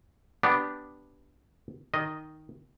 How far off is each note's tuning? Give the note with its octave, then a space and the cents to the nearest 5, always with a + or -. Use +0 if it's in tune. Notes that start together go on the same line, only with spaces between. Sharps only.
B3 +0 D4 +0 G4 -10
D#3 +0 D#5 +0